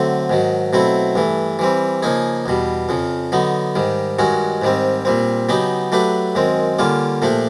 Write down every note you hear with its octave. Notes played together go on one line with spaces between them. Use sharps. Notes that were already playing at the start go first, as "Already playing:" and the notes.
Already playing: D3 F#3 A3 C4
G#2 D#3 F#3
B2 F#3 A3 C4 E4
G2 E3 A3
E3 G3 C4
C#3 F3 A#3 D#4 G#4
E2 B2 G3
F2 C#3 F3
D3 F#3 B3 D#4
G#2 D#3 G3
G2 D#3 G#3 C#4 F#4
G#2 D#3 G3 C4
A#2 G3 C4
C#3 F#3 B3 D#4 G4
F#3 A3 D4 G4 B4
F#2 D#3 G#3 C4
D3 G3 A#3 C#4 F4
A#2 F3 A3 D4 G4